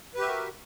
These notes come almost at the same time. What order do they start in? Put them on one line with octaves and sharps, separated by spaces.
B4 G4 E5 F#4 A#4